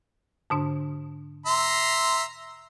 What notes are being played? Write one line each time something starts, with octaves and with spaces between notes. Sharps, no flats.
G#2 D3 D4
E5 A#5 C6